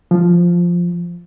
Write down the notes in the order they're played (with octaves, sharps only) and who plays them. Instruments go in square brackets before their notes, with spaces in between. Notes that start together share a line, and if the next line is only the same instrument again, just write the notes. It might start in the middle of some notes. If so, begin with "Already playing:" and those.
[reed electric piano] F3